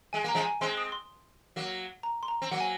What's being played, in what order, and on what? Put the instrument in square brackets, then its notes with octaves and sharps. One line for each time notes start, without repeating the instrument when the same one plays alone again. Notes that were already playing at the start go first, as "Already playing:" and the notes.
[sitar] G#3 [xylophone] G#5
[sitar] A#3 [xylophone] A#5
[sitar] F3 G#3
[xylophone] G#5
[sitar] G#3 C4 [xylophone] C6
[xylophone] D#6
C6
[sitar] F#3 A#3
[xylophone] A#5
C6
A#5
[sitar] C4
[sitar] F#3 A#3 [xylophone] F#5
[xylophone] G#5